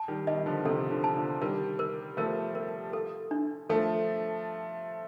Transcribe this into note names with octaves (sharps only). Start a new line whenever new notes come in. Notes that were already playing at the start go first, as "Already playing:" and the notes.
Already playing: A5
D#3 G3
D#3 G3 D#5
D3 F3
C3 D#3 A4
D3 F3
A5
D3 F3
D#3 G3 A#4
A#4
F3 A3 A#4
A#4
A4
D4
F3 A3 A4